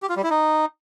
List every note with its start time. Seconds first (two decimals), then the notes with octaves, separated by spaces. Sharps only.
0.02 G4
0.09 F4
0.16 G3
0.23 E4
0.30 D#4